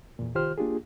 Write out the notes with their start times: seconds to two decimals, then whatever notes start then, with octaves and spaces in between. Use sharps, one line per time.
0.19 E2 A#2
0.35 C2 D#3 F4 G4 C5 F6
0.58 A#3 D4 F4 G4 G#4